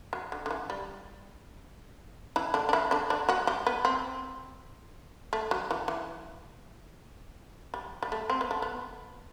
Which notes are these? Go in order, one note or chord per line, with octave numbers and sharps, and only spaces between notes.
F#3
D3
D3
E3
G3
E3 E4
D3 D4
D4
E3 E4
D3 D4
D3 D4
F#3 F#4
G3 G4
B3
C4
A3
F#3
E3
E3
G3
G3
A3
C4
B3
A3
B3